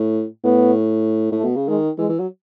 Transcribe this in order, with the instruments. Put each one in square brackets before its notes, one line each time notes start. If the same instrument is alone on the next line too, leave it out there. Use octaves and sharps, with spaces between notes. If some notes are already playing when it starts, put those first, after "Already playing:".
Already playing: [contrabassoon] A2
[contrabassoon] A2 [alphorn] B3
[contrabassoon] A2
[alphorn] A3
[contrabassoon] B2
C#3
[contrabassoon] D#3 [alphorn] G#3
[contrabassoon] E3 [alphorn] G#3
[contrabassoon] E3
F#3